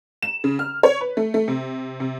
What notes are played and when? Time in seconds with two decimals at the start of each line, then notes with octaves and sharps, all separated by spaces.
0.22 E7
0.44 C#3
0.59 F6
0.83 C#5
1.01 B4
1.17 A3
1.34 A3
1.48 C3
2.00 C3